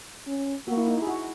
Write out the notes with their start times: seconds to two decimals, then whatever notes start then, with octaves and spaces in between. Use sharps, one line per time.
0.27 C#4
0.68 A#3 F#4
0.77 E4
0.88 D#4
0.98 E4 G#4
1.07 F#4